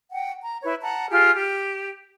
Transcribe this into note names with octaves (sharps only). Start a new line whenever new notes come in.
F#5 G5
A#5
E4 B4 C#5
F#5 A5 A#5
F4 G4 G#4 F6
G4